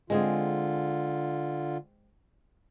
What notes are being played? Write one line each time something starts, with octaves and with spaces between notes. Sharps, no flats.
D3 G#3 C4 F4 G#4